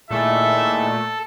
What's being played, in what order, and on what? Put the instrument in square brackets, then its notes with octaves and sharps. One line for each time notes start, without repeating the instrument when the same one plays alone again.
[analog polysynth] A#2 A3 [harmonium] D#3 E4 G#4 [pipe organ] A4 [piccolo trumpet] E5